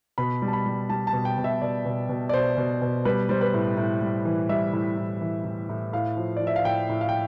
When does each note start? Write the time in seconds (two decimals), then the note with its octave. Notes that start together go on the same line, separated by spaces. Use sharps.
0.18 B2 B5
0.42 G3
0.48 A5
0.53 B5
0.66 G3
0.89 G3 A5
1.07 A5
1.13 B2
1.25 G5
1.38 B2
1.44 E5
1.62 B2 D5
1.85 B2
2.09 B2
2.29 D5
2.34 B2 C5
2.58 B2
2.82 B2
3.05 G3 B4
3.29 G3 C5
3.41 B4
3.54 A2
3.77 A2
4.01 G3
4.25 E3
4.49 G3 E5
4.73 A2
4.97 A2
5.21 E3
5.45 A2
5.69 A2
5.93 A2 F5
6.17 F3
6.37 F3 D5
6.47 E5
6.56 F5
6.65 A2 G5
6.89 A2
7.01 F5
7.09 G5